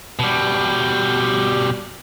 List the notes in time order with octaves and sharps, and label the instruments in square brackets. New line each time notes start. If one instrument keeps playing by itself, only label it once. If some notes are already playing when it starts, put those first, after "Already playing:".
[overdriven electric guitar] B2 G3